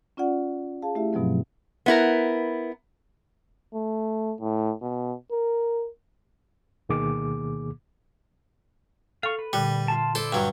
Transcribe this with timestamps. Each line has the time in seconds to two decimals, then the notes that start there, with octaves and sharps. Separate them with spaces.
0.17 C#4 F4 D5 F#5
0.82 G#4 F5 A5
0.95 A3 E4 G4 E5
1.13 G2 B2 F3 F#3 C4
1.86 B3 E4 A#4
3.74 A3
4.40 A2
4.82 B2
5.32 A#4
6.89 D2 B2 D#3 A#3 G#4 D6
9.23 A4 F5 C#6
9.39 B4
9.53 A#2 D3 G3
9.88 F4 A5
10.15 E4 A4 C5 D5
10.33 G2 F#3